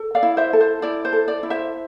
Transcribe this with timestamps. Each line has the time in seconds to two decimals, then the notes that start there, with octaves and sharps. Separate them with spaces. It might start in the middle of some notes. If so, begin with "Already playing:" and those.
Already playing: A4
0.15 D5 F5
0.23 E4
0.37 C5 E5
0.53 A4
0.61 C5
0.82 E4 D5
1.05 C5
1.13 A4
1.28 D5
1.43 E4
1.50 C5 E5